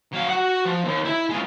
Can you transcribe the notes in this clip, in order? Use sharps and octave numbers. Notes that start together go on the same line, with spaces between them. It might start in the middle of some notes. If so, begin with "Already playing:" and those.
F#3 F5
F#4 F#5
F3
D#2
E4 E5
G#3 F4